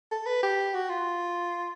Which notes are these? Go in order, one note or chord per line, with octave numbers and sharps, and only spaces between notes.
A4
B4
G4
F#4
F4